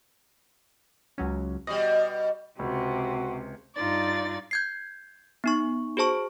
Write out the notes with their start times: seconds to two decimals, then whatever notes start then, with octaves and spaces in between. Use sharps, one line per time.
1.18 C#2 F#3 C#4
1.67 B2 G3 D#5
2.59 C#2 C3 F#4
3.75 G2 D#4 F4 D5 A6
4.51 G6 G#6 C7
5.44 B3 D#4 C#6
5.97 F#4 G#4 C5 A5 C#6